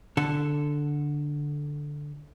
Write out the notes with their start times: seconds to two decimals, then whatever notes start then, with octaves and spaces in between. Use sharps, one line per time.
0.17 D3 A4